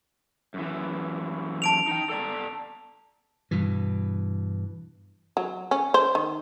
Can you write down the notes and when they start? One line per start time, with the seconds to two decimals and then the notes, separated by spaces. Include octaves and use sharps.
0.54 F#2 E3
1.62 A5 D7 F7
1.87 D#4 G5
2.10 A4 D5 A#5
3.51 G2 B2 E3
5.37 F#3
5.71 C#4
5.94 C5
6.15 D#3